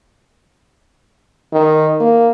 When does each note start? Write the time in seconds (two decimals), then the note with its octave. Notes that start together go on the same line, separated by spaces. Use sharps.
1.53 D#3
2.00 A#3